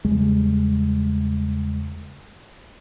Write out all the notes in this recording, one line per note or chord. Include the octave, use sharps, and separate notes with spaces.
E2 C#3 G3 G#3